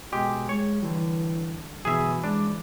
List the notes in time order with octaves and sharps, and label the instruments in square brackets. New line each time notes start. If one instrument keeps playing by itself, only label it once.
[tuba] B2 [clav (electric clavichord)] G#3 G4
[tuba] G#3 [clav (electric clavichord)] C#5
[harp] D3 G3 [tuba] E3
[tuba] B2 [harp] E3 [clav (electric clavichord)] G#4 E5
[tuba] G#3 [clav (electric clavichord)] D4 [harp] D6